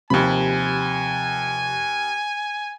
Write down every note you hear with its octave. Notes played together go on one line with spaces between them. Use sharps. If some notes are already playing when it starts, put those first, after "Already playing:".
D#2 C3 F3 C4 G#5 B5